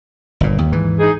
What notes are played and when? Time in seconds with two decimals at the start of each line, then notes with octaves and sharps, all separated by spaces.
0.41 G1 A#2
0.58 D#2
0.72 G#2 E3
0.99 D#4 G#4